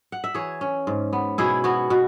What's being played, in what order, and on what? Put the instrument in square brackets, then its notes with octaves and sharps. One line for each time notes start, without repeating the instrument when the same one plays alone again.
[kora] F#5
E5
E3 G#4 C#5
C#4
G#2
B3
B2 E4 G#4
B3 F#4
B2 F#4